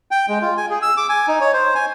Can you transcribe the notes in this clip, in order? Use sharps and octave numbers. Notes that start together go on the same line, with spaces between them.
G5
G#3
F4
G#5
G#4
E6
D6
G#5
D#4
C#5
C5
G#5